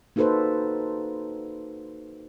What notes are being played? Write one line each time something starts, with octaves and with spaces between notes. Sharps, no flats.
A#3 D#4 F#4 A4 B4 C5